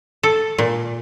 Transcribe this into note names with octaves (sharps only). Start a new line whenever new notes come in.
A4
A#2